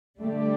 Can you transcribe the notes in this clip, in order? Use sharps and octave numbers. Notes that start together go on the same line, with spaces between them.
D3 G3 A3 D4 G4 D5